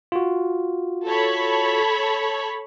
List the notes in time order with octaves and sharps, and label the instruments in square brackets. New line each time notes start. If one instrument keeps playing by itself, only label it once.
[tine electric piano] F4 F#4
[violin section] A4 C#5 B5